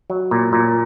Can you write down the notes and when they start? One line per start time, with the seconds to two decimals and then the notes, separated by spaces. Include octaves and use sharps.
0.10 F#3
0.31 A#2
0.53 A#2